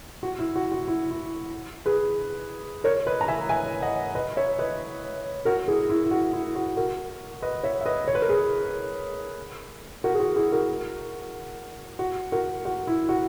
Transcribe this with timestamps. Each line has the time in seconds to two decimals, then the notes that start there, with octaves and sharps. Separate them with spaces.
0.23 F#4
0.39 E4
0.56 F#4
0.72 F#4
0.88 E4
1.11 E4
1.86 G#4 B4
2.84 A#4 C#5
3.06 B4 D#5
3.21 A#5
3.28 E5 G#5
3.49 E5 G#5
3.82 D#5 F#5
4.15 B4 D#5
4.37 C#5 E5
4.58 B4 D#5
5.45 F#4 A#4
5.68 E4 G#4
5.90 E4
6.04 E4
6.11 F#4
6.33 E4
6.55 F#4
6.77 F#4 A#4
7.42 B4 D#5
7.63 C#5 E5
7.81 E5
7.86 B4 D#5
8.08 C#5
8.15 B4
8.22 A#4
8.29 G#4 B4
10.04 F#4 A#4
10.14 G#4
10.20 F#4
10.36 E4 G#4
10.52 F#4 A#4
11.99 F#4
12.32 F#4 A#4
12.65 F#4
12.87 E4
13.09 F#4